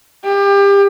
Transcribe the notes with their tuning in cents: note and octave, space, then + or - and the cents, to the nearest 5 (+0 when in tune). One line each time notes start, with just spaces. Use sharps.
G4 +30